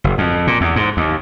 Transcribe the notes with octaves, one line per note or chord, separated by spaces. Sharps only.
F#1
F2
A#2
E2
G#2
D#2